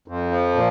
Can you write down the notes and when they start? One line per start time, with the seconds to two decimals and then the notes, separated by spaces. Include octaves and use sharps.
0.08 F2
0.31 F3
0.55 A#2